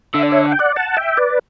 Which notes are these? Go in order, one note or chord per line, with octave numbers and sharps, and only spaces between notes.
D3 E5
D5
C#5 E5
F#5
G5
D5 F#5
F#5 A5
E5 G5
B4 D5